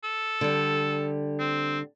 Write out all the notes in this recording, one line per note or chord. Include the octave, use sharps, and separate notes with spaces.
A4
D3 G3
C4